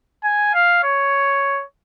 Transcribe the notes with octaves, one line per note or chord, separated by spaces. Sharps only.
G#5
F5
C#5